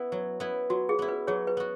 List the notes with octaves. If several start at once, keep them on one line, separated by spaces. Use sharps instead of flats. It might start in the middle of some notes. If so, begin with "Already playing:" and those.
Already playing: B3 E4
F#3
B3 E4
F#3 F#4
G#4
B3 E4
B4
F#3 G#4 C#5
B4
B3 F#4